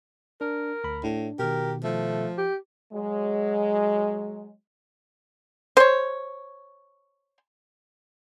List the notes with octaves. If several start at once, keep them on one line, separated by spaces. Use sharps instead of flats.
D4 A#4
D2 B5
A2 D4
B2 D#3 G4 A#4
F3 A3
G4
F#3 G#3
C5 C#5